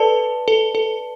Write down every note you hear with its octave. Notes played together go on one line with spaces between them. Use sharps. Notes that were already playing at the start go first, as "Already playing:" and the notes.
Already playing: A4 B4 D5 A5
A4
A4